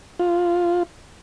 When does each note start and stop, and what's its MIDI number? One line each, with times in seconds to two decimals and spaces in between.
0.19 0.83 65